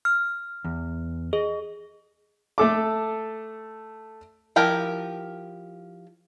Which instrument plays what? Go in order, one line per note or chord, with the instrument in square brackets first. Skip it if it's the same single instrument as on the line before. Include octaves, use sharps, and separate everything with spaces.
[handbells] F6
[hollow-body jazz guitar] E2
[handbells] G#4 [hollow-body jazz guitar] D#5
[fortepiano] A3 A4 D6
[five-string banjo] F3 E4 G4 A#4 G5